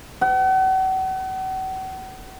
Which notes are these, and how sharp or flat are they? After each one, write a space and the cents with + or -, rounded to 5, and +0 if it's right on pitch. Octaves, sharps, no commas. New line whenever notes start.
F#5 +40